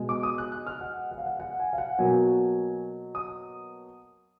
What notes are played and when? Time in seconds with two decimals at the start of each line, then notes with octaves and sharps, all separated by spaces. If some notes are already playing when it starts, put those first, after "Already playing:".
Already playing: B2 G#3
0.09 D6
0.23 D#6
0.38 F#6
0.52 F#6
0.67 F6
0.81 F#5
1.11 F#5
1.18 F5
1.26 F#5
1.40 F#5
1.60 G#5
1.73 F5
1.78 F#5
1.98 B2 F#3 A#3 G#5
3.15 D#6